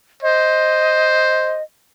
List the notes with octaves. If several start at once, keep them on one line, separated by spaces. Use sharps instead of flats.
C5 D#5